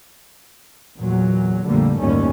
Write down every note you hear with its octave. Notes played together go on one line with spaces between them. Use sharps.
E2 A#2 F#3
A#1 F2 D3 G3 A3 A#3
G1 D#2 A2 G3 C#4